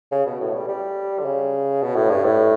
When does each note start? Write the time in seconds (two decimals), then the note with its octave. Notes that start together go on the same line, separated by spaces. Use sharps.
0.12 C#3
0.26 B2
0.40 A2
0.55 G3
0.69 G3
1.20 D3
1.25 C#3
1.82 B2
1.96 A2
2.10 G2
2.25 A2